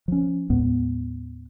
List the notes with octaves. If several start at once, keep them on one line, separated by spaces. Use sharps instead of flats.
F3 C#4
D#2 A2 G#3 B3